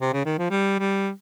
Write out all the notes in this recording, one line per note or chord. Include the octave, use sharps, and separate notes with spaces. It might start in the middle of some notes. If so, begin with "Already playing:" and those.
C3
C#3
D#3
F3
G3
G3